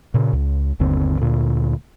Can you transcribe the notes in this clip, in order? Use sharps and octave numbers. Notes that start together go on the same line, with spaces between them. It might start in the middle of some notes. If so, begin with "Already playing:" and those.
A#2 C#3
C#2
G1 D#2 D3 C4
D2 A#2